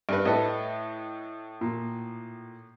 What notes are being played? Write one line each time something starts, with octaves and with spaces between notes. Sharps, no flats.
G2 B4
A2 A4 B4 D#5
A#2